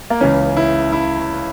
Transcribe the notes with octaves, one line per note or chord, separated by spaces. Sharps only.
A#3
C#2 C#3 E3 C#4
E4
E4